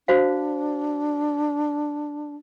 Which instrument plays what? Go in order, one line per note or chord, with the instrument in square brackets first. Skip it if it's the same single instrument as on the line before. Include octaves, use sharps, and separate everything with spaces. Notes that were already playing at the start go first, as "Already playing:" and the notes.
[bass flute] D4 [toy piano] F#4 C5 F5